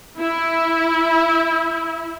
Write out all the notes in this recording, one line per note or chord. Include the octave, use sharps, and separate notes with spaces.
E4